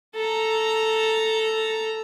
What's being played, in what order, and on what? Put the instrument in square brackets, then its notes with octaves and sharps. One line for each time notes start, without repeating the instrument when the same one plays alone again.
[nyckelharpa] A4 A#5